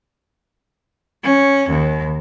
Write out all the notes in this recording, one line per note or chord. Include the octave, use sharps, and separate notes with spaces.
C#4
D#2